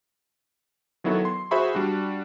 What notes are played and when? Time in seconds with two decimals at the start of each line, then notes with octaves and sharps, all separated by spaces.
1.04 D#3 F#3 B3 E4 F#4 A4
1.25 C6
1.51 F#4 G#4 C5 E5 B5 C#6
1.75 G3 D4 F#4